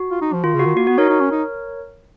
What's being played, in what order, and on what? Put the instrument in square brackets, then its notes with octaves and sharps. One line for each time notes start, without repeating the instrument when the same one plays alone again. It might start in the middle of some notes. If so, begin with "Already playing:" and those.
Already playing: [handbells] F#4
[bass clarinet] F4
D#4
F3
[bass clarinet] D#3 [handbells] F4
[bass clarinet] C#3
[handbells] F#4
[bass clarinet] D#3
[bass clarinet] A#3 [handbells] F#4
[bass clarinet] B3 [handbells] F#4
[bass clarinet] D#4 [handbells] A#4 C#5
[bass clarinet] D#4
C#4
D#4